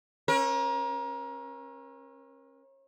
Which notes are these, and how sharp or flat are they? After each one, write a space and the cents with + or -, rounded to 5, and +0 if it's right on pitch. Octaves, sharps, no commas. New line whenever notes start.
C#4 -35 A#4 +30